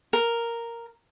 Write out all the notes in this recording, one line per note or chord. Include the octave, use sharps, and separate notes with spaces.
A#4